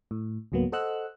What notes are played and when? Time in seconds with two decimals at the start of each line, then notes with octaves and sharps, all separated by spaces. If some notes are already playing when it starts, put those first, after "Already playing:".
0.11 A2
0.52 C#2 G#2 F#3 A#3 B3
0.72 A4 C5 D#5 F#5 E6 F#6